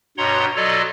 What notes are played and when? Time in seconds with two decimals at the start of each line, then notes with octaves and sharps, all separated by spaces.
0.18 G2 B2 C#5 F#5 A#5 C6
0.56 B2 F#3 F4 A4 D5 D#5